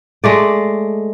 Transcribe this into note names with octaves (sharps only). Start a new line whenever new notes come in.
G#3 A3 D5